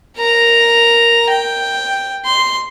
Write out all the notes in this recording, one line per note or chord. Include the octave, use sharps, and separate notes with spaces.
A#4 A#5
G5
C6